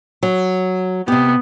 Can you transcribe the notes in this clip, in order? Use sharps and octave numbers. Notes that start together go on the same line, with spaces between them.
F#3
C3 B3 G4